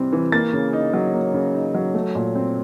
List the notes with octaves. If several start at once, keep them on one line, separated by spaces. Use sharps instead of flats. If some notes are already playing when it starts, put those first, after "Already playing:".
Already playing: C3 E3 G3 C4
E3
A#3 A6
C#3
D#4
F#3
A#3
C#3
D#4
F#3
A3
A#2
C4